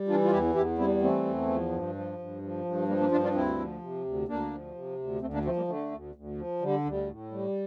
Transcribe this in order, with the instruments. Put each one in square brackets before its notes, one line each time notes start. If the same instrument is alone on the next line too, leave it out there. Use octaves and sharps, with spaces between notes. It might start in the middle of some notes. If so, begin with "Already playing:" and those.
Already playing: [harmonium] G3
E3 D4 F4
F4
E2 E4 G4
E2 E4 G4
G3 C4 E4
E3 A3 C4
E2
F3
G2
F3
G2
F3
G2
F3 G3 A#3
A#3 D4
G2 D4 F4
D4 F4
D2 C4 E4
F3
C3
D2
D2 A#3 D4
F3
C3
D2
D2 A3 C4
A#3 D4
F3 A3 C4
G3 A#3
D3 A3
D2
D2
F3
D3 G3
D2 G3
A2
G3